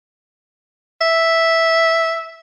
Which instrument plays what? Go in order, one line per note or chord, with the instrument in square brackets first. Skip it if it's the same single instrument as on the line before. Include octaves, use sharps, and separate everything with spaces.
[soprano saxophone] E5